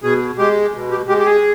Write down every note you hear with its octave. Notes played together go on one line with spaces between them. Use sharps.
B2 G#4
G#3 G4
B2
G4
G#3 G4
G4
G#4